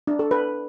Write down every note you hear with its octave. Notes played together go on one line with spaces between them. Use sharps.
D4
A4
B4